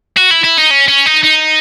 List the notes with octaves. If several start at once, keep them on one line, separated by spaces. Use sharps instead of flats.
F#4
E4
E4
D#4
C#4
C#4
D#4
D#4